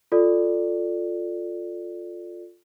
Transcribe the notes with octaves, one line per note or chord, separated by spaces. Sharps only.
F4 A4 D5